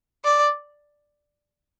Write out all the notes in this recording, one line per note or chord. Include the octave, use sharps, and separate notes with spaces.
D5